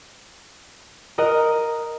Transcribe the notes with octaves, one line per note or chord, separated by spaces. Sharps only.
A#4 D#5 F#5